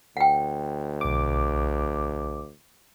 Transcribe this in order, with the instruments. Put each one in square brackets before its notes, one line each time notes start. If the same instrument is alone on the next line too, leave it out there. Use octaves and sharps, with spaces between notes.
[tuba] D2 [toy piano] F#5 G5
[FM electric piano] B1 D6